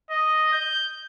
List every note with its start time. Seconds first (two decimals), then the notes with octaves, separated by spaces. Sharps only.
0.10 D#5
0.53 G6